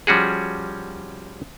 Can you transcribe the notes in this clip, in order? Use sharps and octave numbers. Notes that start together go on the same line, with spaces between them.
F3 G3 C#4 F#4 G#4